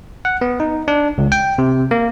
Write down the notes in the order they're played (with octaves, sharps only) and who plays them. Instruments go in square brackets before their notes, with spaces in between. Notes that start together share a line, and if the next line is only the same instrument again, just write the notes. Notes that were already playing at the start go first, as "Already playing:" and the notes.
[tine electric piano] F#5
B3
D#4
D4
C#2
G5
C3
A#3